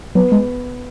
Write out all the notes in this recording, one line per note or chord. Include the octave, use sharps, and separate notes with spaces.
F#3 B3
G#3